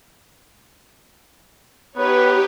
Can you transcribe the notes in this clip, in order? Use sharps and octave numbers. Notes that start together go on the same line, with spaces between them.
B3 D#4 G4 B4 C#5